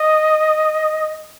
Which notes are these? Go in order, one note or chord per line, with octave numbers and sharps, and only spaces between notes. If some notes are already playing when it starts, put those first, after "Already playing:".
Already playing: D#5